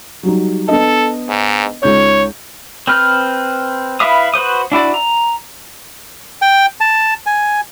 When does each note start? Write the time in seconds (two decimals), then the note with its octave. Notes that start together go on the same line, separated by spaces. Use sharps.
0.23 F#3 G3 D#4
0.68 B3 D4 A4 D#5
1.29 G#2
1.83 C#2 D#4 C#5 G6
2.87 C4 B4 F6 G6
4.00 E4 B4 E5 F5 D#6
4.34 F#4 B4 C5 D#6
4.72 D4 E4 F#4 D5
4.94 A#5
6.42 G5
6.81 A5
7.26 G#5